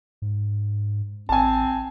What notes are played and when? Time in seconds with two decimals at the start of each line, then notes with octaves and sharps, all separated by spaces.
0.22 G#2
1.29 A1 C4 G#5 A5